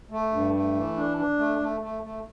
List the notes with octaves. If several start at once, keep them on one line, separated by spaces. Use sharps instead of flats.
A3
G2
A3
E3
D4
D4
A3
A3
A3
A3